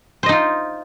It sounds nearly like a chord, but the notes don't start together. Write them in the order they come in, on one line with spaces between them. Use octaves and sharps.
C5 D#5 D#4 F4